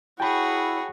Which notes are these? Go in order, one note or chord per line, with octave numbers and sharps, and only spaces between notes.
E4 F#4 G#4 C#5 G5 A5 B5